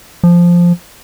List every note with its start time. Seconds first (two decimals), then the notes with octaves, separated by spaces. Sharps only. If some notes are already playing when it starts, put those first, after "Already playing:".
0.23 F3